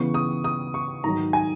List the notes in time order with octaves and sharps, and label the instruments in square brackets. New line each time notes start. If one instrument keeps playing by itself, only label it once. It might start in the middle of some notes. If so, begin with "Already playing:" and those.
Already playing: [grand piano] C#3 E3 B3 C#6
D#6
D#6
C#6
G#2 D#3 F#3 A#5
G#5